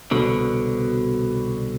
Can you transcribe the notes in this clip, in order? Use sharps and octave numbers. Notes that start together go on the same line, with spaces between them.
C2 B2 D3